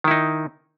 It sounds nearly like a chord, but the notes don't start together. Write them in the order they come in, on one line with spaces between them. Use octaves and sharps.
D#3 E4 D#4